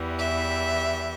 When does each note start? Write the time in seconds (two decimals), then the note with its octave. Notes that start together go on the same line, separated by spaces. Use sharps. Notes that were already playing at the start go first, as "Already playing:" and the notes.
Already playing: E2 E3 G3
0.19 E5